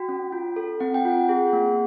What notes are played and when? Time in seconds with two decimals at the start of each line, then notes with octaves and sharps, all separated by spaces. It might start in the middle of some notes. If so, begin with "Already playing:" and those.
Already playing: F#4 G5
0.09 C#4
0.32 F4
0.56 A4
0.80 C4 F#5
0.94 G5
1.05 F4 F#5
1.29 G#4
1.53 A#3